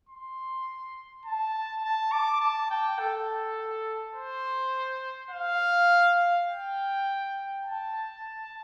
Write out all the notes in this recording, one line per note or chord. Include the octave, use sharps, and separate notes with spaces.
C6
A5
A5
D6
A5
G5
A4
C5
F5
G5
A5